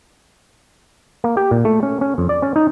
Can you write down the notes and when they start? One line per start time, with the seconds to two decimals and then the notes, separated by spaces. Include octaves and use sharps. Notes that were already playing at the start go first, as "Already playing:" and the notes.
1.24 A#3
1.37 G4
1.51 A#2
1.65 A3
1.83 C#4
2.01 C#4
2.18 F2
2.29 D5
2.42 C#4
2.56 D#4